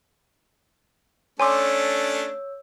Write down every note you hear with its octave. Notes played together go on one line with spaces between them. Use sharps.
A3 C#4 D4 C#5 G#5 C6 D6 E6